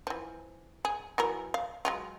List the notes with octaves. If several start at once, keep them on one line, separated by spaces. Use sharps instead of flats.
E3 F3
G#4
E3 F#3 A#4
F5
F#3 G#3 F4